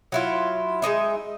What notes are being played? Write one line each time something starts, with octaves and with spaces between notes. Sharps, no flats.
F#3 E4 F4
G#3 A#3 D#4 E5